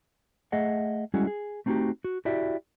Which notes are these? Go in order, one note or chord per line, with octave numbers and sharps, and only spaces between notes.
A3 G#4 D#5 E5 F#5
G3 G#3 C#4 E4 F#4 G#4
G#4
A3 C4 D#4 E4 F#4 G4
F#4
E4 F#4 G4 D5 E5